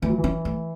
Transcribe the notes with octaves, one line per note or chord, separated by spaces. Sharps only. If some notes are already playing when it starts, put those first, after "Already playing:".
E3 A3
F#3
E3
C#4
A3